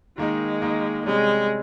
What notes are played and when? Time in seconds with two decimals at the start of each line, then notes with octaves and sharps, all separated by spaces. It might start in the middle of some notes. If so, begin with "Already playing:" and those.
0.18 D#3 G#3 A#3 D#4
0.62 D#3 A#3 D#4
1.05 C3 G3 G#3 C#4